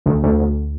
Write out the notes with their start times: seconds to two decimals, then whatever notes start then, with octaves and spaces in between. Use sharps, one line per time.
0.06 D2
0.23 D2
0.39 D2